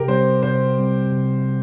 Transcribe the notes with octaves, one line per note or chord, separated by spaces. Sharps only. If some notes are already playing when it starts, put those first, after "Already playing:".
Already playing: C3 G4 A#4
G3 C4 C5
C3 C5
G3 C4
C3